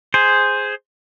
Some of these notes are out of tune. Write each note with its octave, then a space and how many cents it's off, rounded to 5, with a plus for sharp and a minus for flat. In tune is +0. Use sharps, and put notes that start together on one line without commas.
G#4 +0 C5 +0